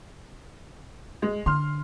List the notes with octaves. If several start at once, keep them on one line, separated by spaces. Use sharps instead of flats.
G#3
D3 C6 F6